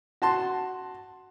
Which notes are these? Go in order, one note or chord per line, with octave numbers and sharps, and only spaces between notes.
F#4 A5 C6